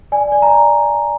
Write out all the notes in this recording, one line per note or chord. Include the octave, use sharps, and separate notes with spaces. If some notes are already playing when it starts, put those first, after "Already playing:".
D5 G#5
D5
A#5
D5